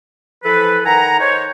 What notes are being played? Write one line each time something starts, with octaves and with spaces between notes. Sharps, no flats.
E3 F3 A4 B4
D#3 F#5 G#5 A#5
D#4 C5 C#5